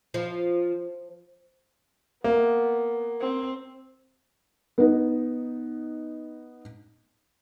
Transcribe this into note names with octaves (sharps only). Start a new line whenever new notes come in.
F3
A#3 B3
C4
B3 D#4